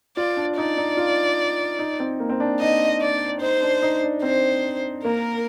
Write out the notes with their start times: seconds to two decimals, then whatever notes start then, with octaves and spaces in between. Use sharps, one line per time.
0.17 F4 D5
0.37 D4
0.57 D#4 D5
0.77 D#4
0.97 F4
1.79 D#4
2.00 C4
2.20 A#3
2.29 C4
2.40 D4
2.60 D#4 D#5
3.01 D5
3.41 D#4 C5
3.62 D4
3.82 D#4
4.03 D4
4.22 C4 C5
5.05 A#3 A#4